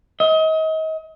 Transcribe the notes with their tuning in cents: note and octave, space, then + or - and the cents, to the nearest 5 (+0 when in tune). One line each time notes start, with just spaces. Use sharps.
D#5 +35